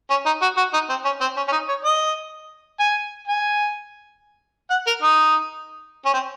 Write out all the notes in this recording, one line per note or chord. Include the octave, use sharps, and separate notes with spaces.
C#4
D#4
F#4
F#4
D#4
C4
C#4
C4
C#4
C#4
D#4
C#5
D#5
G#5
G#5
F#5
A#4
D#4
C#4
C4